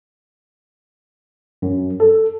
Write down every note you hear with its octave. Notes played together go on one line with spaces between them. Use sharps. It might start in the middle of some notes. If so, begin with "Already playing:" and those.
F#2
A4